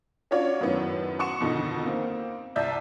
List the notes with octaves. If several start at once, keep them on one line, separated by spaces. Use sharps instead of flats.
C#4 D4 F4 F#4 C#5 D5
F#2 A2 D#3 B3
F#5 C6 C#6 C#7 E7
F2 B2 D3 D#3 D#4
A#3 C4
C2 D5 E5 A5 G6